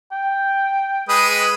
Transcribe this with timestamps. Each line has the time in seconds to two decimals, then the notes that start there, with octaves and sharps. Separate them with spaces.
0.12 G5
1.09 G#3 B4 D#6